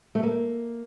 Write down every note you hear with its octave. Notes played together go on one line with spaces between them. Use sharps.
A3
A#3